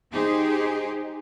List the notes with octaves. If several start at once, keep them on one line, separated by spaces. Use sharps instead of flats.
D#4 G4 G#4 C5